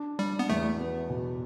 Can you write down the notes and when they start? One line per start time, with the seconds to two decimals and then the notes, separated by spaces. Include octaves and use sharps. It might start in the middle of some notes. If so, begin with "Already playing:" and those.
Already playing: D4
0.19 G3 D4
0.39 B3
0.49 E2 A3
0.80 B3
1.10 B2